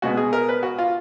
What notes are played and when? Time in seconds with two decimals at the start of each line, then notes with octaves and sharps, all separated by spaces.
0.02 B2 G#3 B3 F#4
0.17 G#4
0.33 A#4
0.49 B4
0.63 F#4
0.78 F4